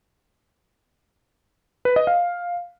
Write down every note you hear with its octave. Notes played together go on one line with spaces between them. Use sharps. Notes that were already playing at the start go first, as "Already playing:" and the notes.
B4
D#5
F5